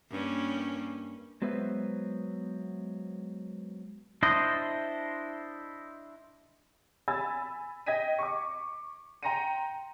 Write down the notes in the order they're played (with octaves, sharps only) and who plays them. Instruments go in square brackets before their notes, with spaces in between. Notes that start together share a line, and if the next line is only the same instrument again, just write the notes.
[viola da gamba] G2 A#3 C#4
[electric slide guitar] F#3 G#3 B3 B4 C5 E5
[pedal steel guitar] D4 E4 C5 D#5
[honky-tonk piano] G#5 B5 E6 G#6 A6
D#5 G5 G#6 A#6 B6 D#7
C#6 D6
G5 A#5 C6 A#6 C#7 D#7